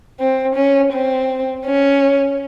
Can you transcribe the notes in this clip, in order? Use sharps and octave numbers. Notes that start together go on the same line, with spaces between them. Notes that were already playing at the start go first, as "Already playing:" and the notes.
C4
C#4
C4
C#4